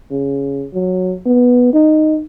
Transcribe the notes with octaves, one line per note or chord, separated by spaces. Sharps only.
C#3
F#3
B3
D#4